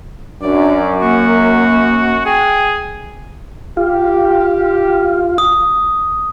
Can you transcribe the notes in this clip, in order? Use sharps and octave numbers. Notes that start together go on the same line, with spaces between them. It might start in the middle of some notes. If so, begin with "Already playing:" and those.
F#2 D4 D5
A#3 F#4
G#4 G5
F4 G4
D#6